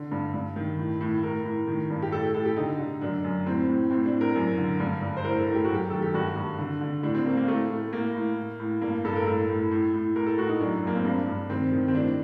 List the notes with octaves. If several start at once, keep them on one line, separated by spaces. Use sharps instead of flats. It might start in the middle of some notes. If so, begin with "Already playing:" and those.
Already playing: D3
G2
G2
D#3
A2
A2
A2 A#4
A2
D#3
G2
G4
A2 A4
G4
A2 A4
G4
D3 D#4
D3
F#2 D4
F#2
A2 C4
A2
A2 C4
D4
A2
A#4
F#2
D3
G2
G2
C5
A2 A#4
A4
A2
G4
F#2 F#4
G4
D#3 A4
G4
G2 F#4
G2
D3
D3
A2 D4
C4
A2 A#3
A#3
A2 A3
A2
A2 A#3
A2
A2
A2
G2 A#3
G2 A4
A#4
A2 A4
A2
A2
A2
A2 A#4
A4
A2 F#4
D#4
F#2 D4
F#2 A#3
C4
G2 D4
G2
D#3 C4
D#3
C4
A2 D4